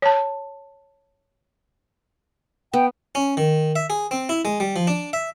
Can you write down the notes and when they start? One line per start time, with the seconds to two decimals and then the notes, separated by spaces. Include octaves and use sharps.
0.02 C#5 A5
2.73 B3 G5
3.15 C#4
3.37 D#3
3.76 E5
3.90 G#4
4.11 C4
4.29 E4
4.45 G#3
4.60 G3
4.76 F3
4.87 D4
5.13 E5